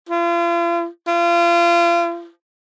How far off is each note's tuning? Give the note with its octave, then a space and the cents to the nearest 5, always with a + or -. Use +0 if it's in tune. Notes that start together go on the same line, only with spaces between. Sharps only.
F4 -40
F4 -35